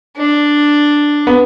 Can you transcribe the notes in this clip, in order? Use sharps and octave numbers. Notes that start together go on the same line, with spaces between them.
D4
B3